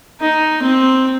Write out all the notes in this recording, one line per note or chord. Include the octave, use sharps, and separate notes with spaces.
D#4
C4